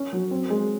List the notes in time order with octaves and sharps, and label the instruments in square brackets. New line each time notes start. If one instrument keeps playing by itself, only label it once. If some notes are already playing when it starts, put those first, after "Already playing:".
Already playing: [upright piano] C#4
F#3
C4
G#3